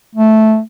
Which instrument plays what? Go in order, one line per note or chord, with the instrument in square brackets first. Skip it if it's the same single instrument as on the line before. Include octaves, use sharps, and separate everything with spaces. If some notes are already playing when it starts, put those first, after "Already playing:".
[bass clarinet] A3